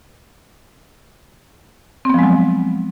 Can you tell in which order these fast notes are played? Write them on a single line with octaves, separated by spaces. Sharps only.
C4 B3 F3 G#3 F#3